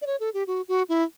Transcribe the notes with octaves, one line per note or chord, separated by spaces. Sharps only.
D5
C#5
A4
G4
F#4
F#4
E4